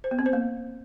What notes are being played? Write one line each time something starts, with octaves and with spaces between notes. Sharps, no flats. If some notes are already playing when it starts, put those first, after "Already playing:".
C5
B3
C4
C5
A#3